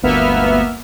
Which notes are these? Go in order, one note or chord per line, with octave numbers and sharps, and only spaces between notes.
G1 D2 A#3 B3 E5 F6